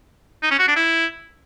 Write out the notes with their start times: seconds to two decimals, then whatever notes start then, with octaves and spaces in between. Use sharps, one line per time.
0.43 D#4
0.51 C#4
0.59 F#4
0.68 D4
0.76 E4